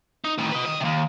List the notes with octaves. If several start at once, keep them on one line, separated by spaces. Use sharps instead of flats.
D#4
A2 D#3
B4 D#5
D#3 D#5
D#2 C3